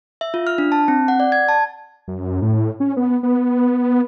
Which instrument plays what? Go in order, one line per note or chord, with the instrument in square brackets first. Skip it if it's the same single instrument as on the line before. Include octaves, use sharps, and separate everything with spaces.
[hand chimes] E5
F4
F6
D4
A5
C4
F#5
D5
G#6
A5
[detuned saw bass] F#2
A2
C#4
B3
B3